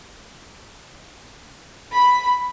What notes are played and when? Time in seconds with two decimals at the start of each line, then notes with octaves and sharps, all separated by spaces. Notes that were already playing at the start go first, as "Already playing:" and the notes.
1.91 B5